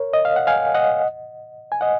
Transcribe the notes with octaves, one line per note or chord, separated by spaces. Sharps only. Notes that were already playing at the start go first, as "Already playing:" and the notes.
Already playing: A#4 C#5
D#5
F5
F#5
F5 G#5
D#5 F#5
G#5
D#5 F#5